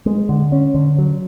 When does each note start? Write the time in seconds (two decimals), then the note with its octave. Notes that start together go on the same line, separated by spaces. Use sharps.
0.06 G#3
0.29 D3
0.52 C#4
0.75 D3
0.98 F#3